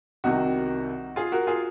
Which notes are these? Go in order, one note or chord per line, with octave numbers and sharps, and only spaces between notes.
C2 C3 D#3 D#4 F#4
F4 G#4
F#4 A#4
F4 G#4